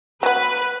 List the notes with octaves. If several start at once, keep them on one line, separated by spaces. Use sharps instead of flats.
F#3 B3 B4